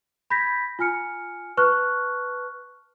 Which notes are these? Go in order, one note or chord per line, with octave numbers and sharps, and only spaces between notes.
B5 G6 G#6 A#6 B6
F4 G#5 F6 C#7
B4 A5 C#6 F6 F#6